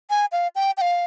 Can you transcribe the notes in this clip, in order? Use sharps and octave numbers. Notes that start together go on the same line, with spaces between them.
G#5
F5
G5
G5
F5